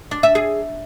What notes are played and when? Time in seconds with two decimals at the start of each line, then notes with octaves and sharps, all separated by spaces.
0.11 D4
0.23 E5
0.35 G#4